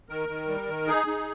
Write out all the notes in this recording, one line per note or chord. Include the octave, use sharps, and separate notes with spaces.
D#3 A#4
D#3
G3
D#3
D#4 G#4
D#4